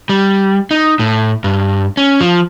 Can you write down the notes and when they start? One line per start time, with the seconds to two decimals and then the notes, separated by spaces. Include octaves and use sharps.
0.09 G3
0.71 D#4
0.99 A2
1.44 G2
1.97 C#4
2.21 F3